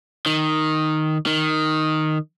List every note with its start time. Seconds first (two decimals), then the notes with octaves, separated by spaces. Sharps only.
0.26 D#3
1.26 D#3